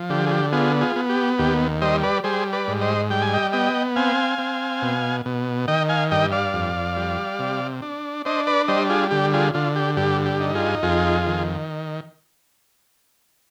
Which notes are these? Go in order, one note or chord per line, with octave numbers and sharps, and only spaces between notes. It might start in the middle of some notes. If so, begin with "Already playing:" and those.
Already playing: F3
D3 G4
G#4
G4
B3 F4 G#4
F4 G#4
B3
G4
D#2 G4
G3 C5 D#5
B4 D5
G3 G#4 C5
B4 D5
G#2
C5 D#5
G3 G5
G#5
D#5 G5
B3 D#5 G5
C4 F5 G#5
C4
B2
B2
D#3 D#5 G5
F5 G#5
G2 D#5 G5
D5 F5
F2
G3
C3
D4
D4 C5 D#5
B4 D5
G3 C5 D#5
F4 G#4
D3 G4
F4 G#4
D3 F4
G4
G2 G4
G4
D#4
F4 G#4
F2 F4 G#4
D#3